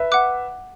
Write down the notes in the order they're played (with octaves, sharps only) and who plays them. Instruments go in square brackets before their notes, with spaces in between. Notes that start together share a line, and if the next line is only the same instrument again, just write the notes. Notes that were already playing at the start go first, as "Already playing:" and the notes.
Already playing: [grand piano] B4 E5
[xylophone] F#5 D6 F#6